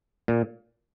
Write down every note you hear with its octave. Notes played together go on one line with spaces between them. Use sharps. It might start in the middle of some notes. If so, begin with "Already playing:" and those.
A#2